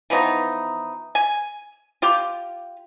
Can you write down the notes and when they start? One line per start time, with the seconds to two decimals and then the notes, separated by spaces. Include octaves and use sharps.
0.10 E3 F3 B3 D#4
1.15 G#5
2.02 F4 G4